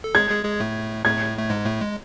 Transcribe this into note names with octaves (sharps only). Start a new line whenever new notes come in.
A4
G#3 G#4 G#6
G#3 G#4
G#3 G#4
A2 A3
A2 A3 G#6
A3
G#2 G#3
A2 A3
G#3